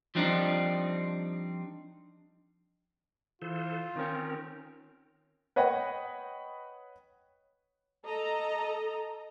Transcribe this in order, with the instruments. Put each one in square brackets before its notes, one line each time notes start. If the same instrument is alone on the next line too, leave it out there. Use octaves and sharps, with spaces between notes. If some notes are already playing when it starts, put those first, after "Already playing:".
[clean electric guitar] F3 G3 C4 D4 D#4
[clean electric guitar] E3 [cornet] F4 [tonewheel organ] A4 C5
[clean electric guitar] D#3 C#4 [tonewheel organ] C4 A#4
[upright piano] B4 C#5 D#5 F#5 G5
[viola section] A4 D#5 A#5